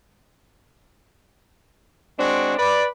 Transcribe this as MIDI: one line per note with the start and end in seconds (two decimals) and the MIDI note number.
2.19 2.53 56
2.19 2.53 60
2.19 2.53 62
2.19 2.53 66
2.58 2.86 71
2.58 2.86 74